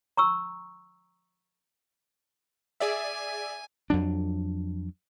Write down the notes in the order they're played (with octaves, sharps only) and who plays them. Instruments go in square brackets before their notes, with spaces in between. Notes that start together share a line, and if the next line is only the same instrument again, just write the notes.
[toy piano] A#5 C#6 E6
[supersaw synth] G#4 D5 E5 [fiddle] G#5
[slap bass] F2 F#3 D4